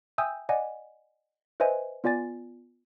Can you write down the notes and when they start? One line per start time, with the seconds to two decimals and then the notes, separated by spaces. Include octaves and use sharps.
0.18 E5 G5 G#5 D#6 E6 G6
0.49 D5 D#5 F#5 G#5
1.60 B4 C5 D#5 E5 G#5
2.04 B3 F4 D5 G#5 A6